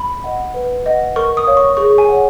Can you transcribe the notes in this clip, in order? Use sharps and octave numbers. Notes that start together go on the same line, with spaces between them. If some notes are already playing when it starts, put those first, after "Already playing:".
Already playing: B5
D#5 F#5
B4
D#5 F#5
A#4 C#6
D#6
C#5 F5
C#6
G#4 C#6
G#5
C#5 F#5